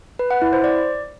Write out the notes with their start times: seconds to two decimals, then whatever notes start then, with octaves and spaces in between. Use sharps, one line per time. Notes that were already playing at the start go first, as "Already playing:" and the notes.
0.19 B4
0.31 F#5
0.42 E4
0.53 C5
0.64 D5